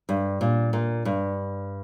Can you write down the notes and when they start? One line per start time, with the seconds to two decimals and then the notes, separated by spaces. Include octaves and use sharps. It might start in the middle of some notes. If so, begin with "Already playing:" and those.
0.09 G2
0.41 A#2
0.73 A#2
1.05 G2